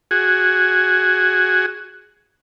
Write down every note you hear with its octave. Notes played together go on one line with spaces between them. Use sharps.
F#4 G#4